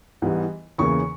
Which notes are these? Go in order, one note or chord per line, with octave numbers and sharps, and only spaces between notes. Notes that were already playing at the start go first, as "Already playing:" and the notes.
G#2 E3 G3 B3
E2 C#3 E3 A#3 C#6